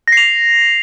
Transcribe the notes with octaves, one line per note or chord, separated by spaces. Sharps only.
A#6 C7 F7